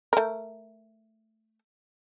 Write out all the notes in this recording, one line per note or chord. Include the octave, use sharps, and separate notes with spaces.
A3 A#4